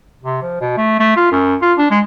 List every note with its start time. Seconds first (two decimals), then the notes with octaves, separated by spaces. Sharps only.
0.23 C3
0.42 F3
0.61 B2
0.77 A3
1.00 A3
1.17 F4
1.32 F#2
1.62 F4
1.78 D4
1.91 G#3